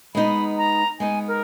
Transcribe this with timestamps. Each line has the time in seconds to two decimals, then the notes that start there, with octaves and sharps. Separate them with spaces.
0.15 G#3 B3 D#4 B5
0.58 A#5
0.99 G#3 B3 D#4 G#5
1.28 A#4